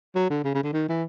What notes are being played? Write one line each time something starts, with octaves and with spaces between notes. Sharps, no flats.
F#3
D3
C#3
C#3
D3
D#3
E3